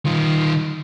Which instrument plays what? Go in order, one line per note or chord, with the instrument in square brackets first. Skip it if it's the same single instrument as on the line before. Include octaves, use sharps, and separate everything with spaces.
[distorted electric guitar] D#3 F4